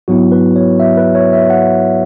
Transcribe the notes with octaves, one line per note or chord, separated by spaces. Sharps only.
G#2 F#3 B3 E4 F#4
B4
C#5
E5
B4
C#5
E5
F#5